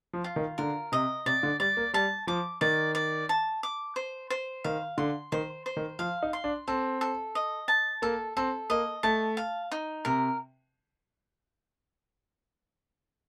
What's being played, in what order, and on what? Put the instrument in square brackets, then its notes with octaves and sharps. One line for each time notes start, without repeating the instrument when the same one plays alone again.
[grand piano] F3
[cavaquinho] F4
[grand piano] D#3
[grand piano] D3 [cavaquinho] A#4
[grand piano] C3 [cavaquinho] D#5
[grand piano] C3 [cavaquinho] D5
[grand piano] D3
[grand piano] G3 [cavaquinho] D5
[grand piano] A#3
[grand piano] G3 [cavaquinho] A5
[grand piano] F3 [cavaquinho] D6
[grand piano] D#3 [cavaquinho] D5
[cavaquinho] D5
A5
D6
C5
C5
[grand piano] D#3 [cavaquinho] F5
[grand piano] D3 [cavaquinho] C6
[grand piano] D#3 [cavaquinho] C5
[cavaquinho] C5
[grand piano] D#3
[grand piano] F3 [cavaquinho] F5
[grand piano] D#4
[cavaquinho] C6
[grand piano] D4
[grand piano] C4 [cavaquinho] A4
[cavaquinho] A4
D#5
A5
[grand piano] A#3 [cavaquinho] A4
[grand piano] C4 [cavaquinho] A4
[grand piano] A#3 [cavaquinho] D#5
[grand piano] A3 [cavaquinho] A5
[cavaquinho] F5
D#4
[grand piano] C3 [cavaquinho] A#4